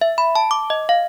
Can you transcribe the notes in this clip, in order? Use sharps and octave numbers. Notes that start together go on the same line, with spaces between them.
E5
B5
A5
D6
D#5
F5